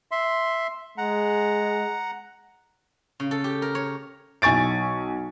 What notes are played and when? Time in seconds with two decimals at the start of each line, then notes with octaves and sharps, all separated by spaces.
0.11 E5 C6
0.98 G#3 F#5 A#5
3.20 C#3
3.31 A4
3.44 G4
3.62 A#4
3.75 C#5
4.42 B1 G#5 C#6 A6 D7